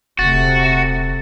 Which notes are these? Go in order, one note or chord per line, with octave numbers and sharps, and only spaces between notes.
D#1 C3 A3 F#4 A6